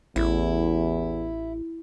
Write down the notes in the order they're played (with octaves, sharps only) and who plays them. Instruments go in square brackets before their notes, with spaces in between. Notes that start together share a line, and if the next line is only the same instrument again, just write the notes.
[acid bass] A1 [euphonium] E2 [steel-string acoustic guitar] E4